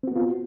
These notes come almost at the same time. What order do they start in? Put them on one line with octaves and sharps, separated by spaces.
C4 F#4 B3 F4